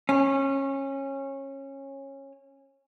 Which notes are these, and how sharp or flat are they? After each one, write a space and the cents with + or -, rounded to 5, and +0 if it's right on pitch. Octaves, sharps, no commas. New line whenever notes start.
C#4 -20